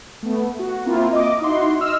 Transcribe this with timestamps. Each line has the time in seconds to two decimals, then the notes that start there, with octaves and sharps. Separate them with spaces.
0.23 A3 B3
0.59 F#4
0.85 A#3 C4 E4 F4
1.12 D#5 D6
1.41 D#4 E4 F#4 C6
1.81 D#5 E6 F6